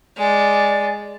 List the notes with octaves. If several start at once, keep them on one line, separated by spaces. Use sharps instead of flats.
G#3 D5